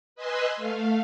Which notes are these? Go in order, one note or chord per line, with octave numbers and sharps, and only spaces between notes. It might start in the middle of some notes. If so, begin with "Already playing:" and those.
B4 D#5 G#5 C6 E6 F#6
A3 F5